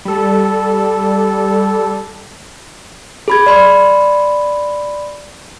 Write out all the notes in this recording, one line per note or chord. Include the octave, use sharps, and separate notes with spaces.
G3 A4
G#4 B5 G#6
D5 B5 C6